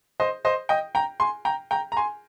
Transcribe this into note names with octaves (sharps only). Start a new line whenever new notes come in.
C5 D#5
C5 D#5
D#5 G5
G5 A#5
G#5 C6
G5 A#5
G5 A#5
A#5
G#5 C6